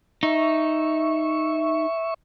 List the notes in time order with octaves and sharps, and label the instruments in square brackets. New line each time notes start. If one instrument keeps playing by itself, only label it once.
[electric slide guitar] D#4 [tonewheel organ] E5 C#6